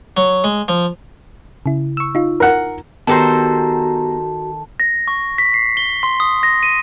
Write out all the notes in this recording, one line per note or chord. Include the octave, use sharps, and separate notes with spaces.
F#3
G#3
F3
C#3 E4
C#6 E6
D#4 F4
A#4 F#5
D#3 B3 F#4 G4 A4 C5 A5 A#5
A#6
C#6
B6
C7
G7
C6
D#6
A#6
D#7